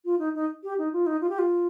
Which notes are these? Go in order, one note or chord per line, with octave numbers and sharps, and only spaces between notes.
F4
D#4
D#4
G4
D#4
F4
D#4
F4
G4
F4